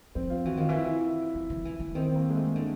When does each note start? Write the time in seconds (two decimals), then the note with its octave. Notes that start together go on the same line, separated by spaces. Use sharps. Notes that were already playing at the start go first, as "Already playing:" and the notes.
0.15 F3 C4
0.30 F4
0.45 E3 F#4
0.57 D#3 F4
0.69 E3
0.75 E4
1.35 F3
1.50 F3
1.65 E3
1.80 E3
1.95 D#3 C4
2.15 A#3
2.30 G#3
2.35 A3
2.55 D3